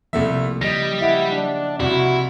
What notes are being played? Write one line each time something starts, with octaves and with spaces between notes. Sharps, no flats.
C2 F3 A3 A#3 E4 E5
C#3 G3 D#5 A#6
E4 E5 F#5
D4
C2 E4 F#4